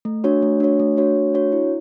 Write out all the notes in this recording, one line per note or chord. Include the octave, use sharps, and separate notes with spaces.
A3
D4 F#4 C#5
A3
D4 F#4 C#5
A3
D4 F#4 C#5
A3
D4 F#4 C#5
E4